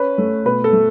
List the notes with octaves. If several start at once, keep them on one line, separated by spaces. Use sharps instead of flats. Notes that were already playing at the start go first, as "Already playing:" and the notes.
Already playing: C#4 B4
A3
B2 B4
A4
A3